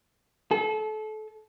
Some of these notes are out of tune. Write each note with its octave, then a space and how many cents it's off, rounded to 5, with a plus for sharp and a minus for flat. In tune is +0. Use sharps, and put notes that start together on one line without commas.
A4 -30